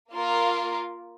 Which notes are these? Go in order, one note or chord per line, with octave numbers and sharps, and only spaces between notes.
A#3 F4 A#4